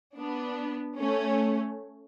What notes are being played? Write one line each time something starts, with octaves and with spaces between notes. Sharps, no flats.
B3 D4
A3 C#4